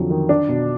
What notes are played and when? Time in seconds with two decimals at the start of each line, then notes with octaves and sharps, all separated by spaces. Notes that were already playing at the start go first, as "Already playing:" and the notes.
Already playing: F2 D3 F#3
0.10 D#3
0.29 D4
0.49 B2